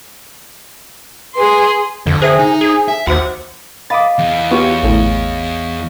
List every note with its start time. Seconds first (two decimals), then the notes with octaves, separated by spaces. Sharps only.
1.36 G#4 B4 C6
2.06 F2 D3 D5
2.22 G#4 C5 E5 G5
2.39 D#4
2.61 G#4
2.88 E5
3.07 D#2 F#4 C5 F#5 D6
3.90 D#5 F5 B5 D6 D#6 A6
4.19 E2
4.51 B3 F4 G4 C#5
4.83 A1 D2 A2